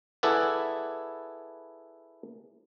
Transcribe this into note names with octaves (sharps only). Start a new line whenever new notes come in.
E4 G#4 A4 B4 D5 F#5